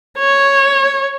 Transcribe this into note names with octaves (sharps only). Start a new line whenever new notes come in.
C#5